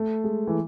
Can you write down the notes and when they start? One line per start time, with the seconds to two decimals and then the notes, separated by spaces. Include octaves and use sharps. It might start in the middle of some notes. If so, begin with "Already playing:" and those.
Already playing: A3
0.24 G#3
0.47 E3